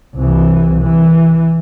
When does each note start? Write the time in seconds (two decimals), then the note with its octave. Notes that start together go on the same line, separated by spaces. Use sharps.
0.15 C2 E3
0.81 E3